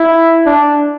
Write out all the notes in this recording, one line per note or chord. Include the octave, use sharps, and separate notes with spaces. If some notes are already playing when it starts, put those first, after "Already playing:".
Already playing: E4
D4